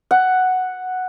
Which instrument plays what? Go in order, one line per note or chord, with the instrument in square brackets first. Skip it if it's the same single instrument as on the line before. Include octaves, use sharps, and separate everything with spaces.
[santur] F#5